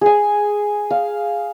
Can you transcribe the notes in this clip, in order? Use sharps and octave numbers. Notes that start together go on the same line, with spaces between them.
G#4 G#5
F5